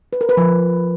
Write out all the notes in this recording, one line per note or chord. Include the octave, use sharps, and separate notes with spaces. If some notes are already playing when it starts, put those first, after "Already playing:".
B4
A#4
B4
F3